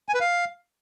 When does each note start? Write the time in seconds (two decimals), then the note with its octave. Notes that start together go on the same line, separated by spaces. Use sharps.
0.09 G#5
0.15 B4
0.20 F5